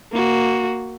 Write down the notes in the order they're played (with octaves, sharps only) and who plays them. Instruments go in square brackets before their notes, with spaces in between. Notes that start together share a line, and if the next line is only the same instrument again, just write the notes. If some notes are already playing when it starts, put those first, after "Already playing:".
[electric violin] A#3 F#4